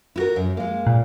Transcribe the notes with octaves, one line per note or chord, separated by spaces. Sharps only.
E4 F#4 A#4
F#2
G#3 A#3
A#2